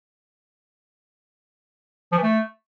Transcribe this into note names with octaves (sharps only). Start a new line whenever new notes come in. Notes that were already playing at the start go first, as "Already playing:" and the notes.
F3
E3
A3